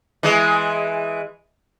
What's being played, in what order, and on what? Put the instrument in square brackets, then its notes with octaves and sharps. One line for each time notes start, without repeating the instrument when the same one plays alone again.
[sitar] E3 G#3